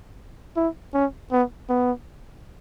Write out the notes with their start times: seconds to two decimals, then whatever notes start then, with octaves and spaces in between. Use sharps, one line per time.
0.56 E4
0.94 C#4
1.32 B3
1.69 B3